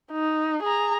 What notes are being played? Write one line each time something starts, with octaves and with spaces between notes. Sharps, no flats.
D#4
G#4 A#5